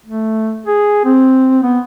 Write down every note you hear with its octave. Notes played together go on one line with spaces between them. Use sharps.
A3
G#4
C4
B3